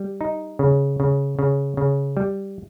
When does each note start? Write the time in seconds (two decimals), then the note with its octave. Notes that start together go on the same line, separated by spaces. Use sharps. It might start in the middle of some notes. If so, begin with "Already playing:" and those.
Already playing: G3
0.21 D#4
0.59 C#3
1.00 C#3
1.39 C#3
1.77 C#3
2.17 G3